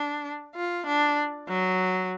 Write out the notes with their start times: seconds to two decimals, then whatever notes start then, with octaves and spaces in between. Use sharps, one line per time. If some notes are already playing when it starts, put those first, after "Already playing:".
Already playing: D4
0.56 F4
0.86 D4
1.48 F#3